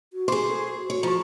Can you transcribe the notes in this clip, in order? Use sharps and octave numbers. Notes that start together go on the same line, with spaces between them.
F#4
G4 G#4 C5 C6 D6
A4
F#4 C#5
F3 A#5 B5 C#6